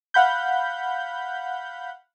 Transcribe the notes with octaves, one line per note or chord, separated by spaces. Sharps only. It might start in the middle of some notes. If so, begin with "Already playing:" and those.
F5 F#5 B5 G6